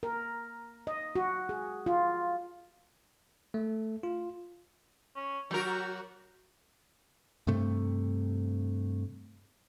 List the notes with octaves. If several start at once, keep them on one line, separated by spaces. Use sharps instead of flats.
A#4
D#5
F#4
G#4
F4
A3
F4
C#4
F#3 F#4 G4 A#4
G2 C3 A3